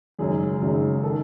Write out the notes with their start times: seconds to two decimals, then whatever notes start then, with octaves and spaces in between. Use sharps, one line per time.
0.19 G#1 F#2 C#3 G#4
0.61 G#1 F#2 C#3
1.03 D#3 A4